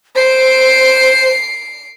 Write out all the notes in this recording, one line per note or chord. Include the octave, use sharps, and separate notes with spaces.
C5 C7 D7